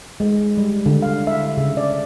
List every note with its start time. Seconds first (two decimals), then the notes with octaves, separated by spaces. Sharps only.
0.20 G#3
0.57 G3
0.86 D3
1.02 F5
1.27 E5
1.57 C#3
1.77 D5